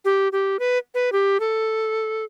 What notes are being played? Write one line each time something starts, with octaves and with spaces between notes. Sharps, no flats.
G4
G4
B4
B4
G4
A4